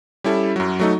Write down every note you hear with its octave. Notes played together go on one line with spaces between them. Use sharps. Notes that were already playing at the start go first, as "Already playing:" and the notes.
G3 C#4 E4 A4
F#2 F#3
F#3 A3 D#4